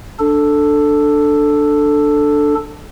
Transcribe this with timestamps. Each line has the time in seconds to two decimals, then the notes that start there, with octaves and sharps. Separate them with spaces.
0.19 D4 A4